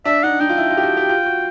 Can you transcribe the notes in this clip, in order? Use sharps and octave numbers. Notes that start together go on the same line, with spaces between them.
D4 E5
D#4 F#5
D#4 G5
F4
E4
F4
G4
F#4
G4
F4
F#4